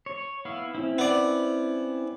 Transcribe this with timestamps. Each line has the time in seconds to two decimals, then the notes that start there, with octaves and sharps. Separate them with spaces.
0.06 C#5
0.45 B3 E4 F5
0.75 C4 C#4 E4
0.98 B3 D5